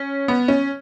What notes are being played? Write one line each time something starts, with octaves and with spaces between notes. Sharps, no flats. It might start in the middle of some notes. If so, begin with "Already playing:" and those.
Already playing: C#4
B3
C#4